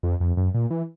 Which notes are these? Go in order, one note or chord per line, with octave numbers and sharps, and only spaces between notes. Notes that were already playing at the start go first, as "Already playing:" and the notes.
F2
F2
F#2
A#2
E3